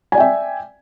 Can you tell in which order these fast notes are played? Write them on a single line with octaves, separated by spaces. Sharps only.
G#5 D5 G5 E5